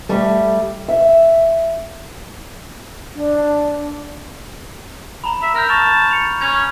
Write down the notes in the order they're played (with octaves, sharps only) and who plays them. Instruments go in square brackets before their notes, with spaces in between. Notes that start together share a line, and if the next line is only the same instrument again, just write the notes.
[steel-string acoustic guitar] G3 A3
E5
[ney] D4
[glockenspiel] A#5 B5
[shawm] E5
[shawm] A#4 [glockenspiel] A#5 F6 G6
[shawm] A5 [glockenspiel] B5 C#6 F7
[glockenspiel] C#7 F7
[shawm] C#4 [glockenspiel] G#6 F7